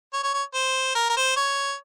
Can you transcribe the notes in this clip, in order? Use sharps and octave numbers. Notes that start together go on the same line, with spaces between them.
C#5
C#5
C#5
C5
A#4
A#4
C5
C#5